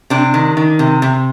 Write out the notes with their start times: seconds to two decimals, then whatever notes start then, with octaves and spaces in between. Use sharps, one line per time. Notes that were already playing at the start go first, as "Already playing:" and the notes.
0.10 C3 D4
0.34 D#3
0.57 D#3
0.79 C3
1.02 C3